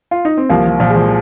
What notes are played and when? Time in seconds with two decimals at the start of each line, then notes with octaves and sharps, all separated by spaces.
0.11 F4
0.25 D#4
0.37 C4
0.49 C2 F3 A#3
0.66 F3
0.80 A#2 F3
0.90 G#3
0.96 F3